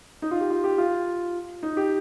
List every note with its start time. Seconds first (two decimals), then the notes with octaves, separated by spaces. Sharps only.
0.22 D#4
0.31 F4
0.41 G4
0.50 F4
0.64 G4
0.78 F4
1.63 D#4
1.77 G4